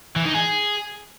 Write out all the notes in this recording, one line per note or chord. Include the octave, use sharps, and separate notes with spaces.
E3
D#4
G#4